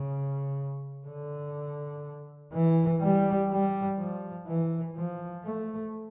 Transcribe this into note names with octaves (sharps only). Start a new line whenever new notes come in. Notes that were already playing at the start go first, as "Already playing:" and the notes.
Already playing: C#3
D3
E3
G3
G3
F3
E3
F3
A3